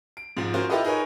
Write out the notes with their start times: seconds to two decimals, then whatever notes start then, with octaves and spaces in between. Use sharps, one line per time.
0.17 D7
0.37 G#2 F3
0.54 C#4 F4 F#4 A#4 C5
0.70 E4 F4 G4 A4 B4 D#5
0.84 D#4 G#4 A#4 B4 C#5